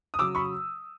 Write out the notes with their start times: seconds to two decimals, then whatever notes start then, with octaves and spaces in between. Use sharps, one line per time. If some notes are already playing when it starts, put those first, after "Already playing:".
0.14 D#6
0.19 C#3 F#3 D6 E6
0.35 B5 C#6